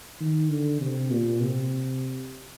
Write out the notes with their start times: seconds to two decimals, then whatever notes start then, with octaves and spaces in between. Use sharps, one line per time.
0.21 D#3
0.50 D3
0.81 C3
1.12 A#2
1.41 C3